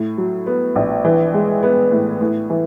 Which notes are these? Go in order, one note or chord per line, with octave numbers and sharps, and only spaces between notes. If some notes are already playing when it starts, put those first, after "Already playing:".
Already playing: A2
F#3
B3
A#1
E3
G#3
B3
A2
A2
E3